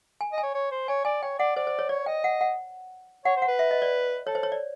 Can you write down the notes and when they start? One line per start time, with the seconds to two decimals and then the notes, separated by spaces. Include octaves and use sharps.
0.21 G#5
0.32 D#5
0.38 G#5
0.43 C#5
0.55 C#5
0.71 C5
0.88 C#5 G#5
1.05 D5 G#5
1.23 C#5 G5
1.39 D5 F#5
1.56 C5 D5
1.67 C5
1.79 C#5
1.89 C#5 D5
2.06 D#5 G5
2.24 F#5
2.41 F#5
3.25 C#5 F#5
3.36 C5
3.42 F#5
3.48 B4
3.59 E5
3.71 D#5
3.82 D5
4.27 A4 C#5
4.35 C5
4.43 C#5
4.52 D5